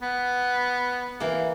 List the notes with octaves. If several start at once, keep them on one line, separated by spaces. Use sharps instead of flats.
B3
E3 A#3